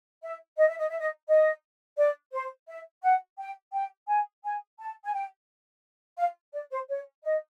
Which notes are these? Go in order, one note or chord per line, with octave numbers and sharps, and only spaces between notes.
E5
D#5
E5
D#5
E5
D#5
D#5
D5
C5
E5
F#5
G5
G5
G#5
G#5
A5
G#5
G5
F5
D5
C5
C#5
D#5